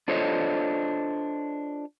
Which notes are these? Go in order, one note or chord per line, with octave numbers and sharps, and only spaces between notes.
D4 F4 A4 C5 C#5 D#5